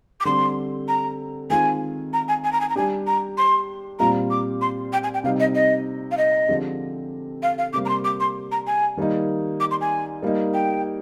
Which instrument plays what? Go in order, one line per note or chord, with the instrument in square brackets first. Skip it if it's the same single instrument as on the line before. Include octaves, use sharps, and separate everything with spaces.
[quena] D6
[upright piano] D3 G3 C4 [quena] C6
[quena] A#5
[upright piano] D#3 G#3 C4 F4 [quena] G#5
[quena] A#5
G#5
G#5
A#5
G#5
A#5
[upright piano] G3 D4 G4 [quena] G#5
[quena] A#5
C6
[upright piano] A#2 G3 C4 F4 [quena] A#5
[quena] D6
C6
G5
G#5
G5
[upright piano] C3 G3 C4 D#4 [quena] F5
[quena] D#5
D#5
F5
D#5
[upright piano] D3 F3 G#3 C4 G4
[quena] F5
F5
[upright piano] C3 G3 A#3 [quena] D6
[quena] A#5
C6
D6
C6
A#5
G#5
[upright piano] D#3 G3 A#3 D#4
[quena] D6
C6
G#5
[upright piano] G3 A#3 D#4
[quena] G5